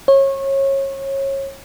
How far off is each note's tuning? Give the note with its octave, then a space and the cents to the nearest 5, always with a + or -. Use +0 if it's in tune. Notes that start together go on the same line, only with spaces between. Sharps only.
C#5 -25